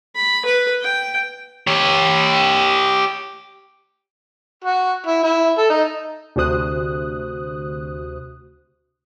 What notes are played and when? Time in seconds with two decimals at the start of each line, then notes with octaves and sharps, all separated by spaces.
0.16 B5
0.45 B4
0.81 G5
1.67 G4 C#5
4.64 F#4
5.06 E4
5.24 E4
5.58 A4
5.70 D#4
6.36 D2 C3 F#4 C5 D#6 F#6